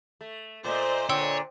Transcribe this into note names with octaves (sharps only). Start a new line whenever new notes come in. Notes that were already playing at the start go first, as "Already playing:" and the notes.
A3
A#2 A3 C5 D5 D#5
A#2 D3 C#5 G5 C6 E6